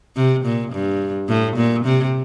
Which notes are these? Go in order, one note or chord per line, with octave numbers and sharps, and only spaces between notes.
C3
A#2
G2
A2
A#2
C3